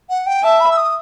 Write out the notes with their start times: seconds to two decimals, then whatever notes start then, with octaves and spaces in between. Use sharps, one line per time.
0.10 F#5
0.27 G5
0.43 E5 A5
0.60 B5
0.71 E6
0.77 D#6